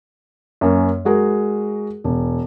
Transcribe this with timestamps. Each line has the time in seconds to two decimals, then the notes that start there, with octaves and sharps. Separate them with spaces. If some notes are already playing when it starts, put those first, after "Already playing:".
0.61 F#2 A#3 C#4
1.05 G#3 F#4 G#4 A#4
2.04 E1